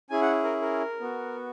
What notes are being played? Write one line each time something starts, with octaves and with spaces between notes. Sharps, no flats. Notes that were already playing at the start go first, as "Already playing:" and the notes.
C#4 E4 G#4 G#5
F#5
A#4
A#4
B3 F#4